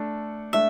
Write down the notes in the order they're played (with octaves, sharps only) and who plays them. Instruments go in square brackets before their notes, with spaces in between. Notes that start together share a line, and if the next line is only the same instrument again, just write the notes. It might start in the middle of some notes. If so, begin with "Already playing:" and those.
Already playing: [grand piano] A3 D4 A4
[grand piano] A3 D4 A4 [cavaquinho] E5